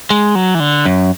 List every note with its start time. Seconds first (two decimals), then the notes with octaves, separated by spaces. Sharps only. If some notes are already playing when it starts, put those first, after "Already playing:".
0.10 G#3
0.35 F#3
0.55 E3
0.60 D3
0.85 F#2